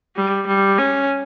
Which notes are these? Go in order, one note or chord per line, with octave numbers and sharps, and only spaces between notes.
G3
G3
C#4